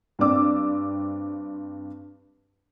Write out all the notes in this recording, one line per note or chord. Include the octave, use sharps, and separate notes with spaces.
G2 C4 D5 D6 E6